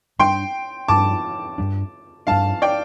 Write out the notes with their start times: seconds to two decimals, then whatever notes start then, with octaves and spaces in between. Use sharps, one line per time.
0.19 G2 G3 D4 G5 C6
0.88 G2 G3 D4 A5 D6
1.58 G2 G3 D4
2.27 G2 G3 D4 F5 A5
2.62 D5 G5